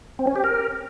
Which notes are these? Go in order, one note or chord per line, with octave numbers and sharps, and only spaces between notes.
C4
C#4
G4
A#4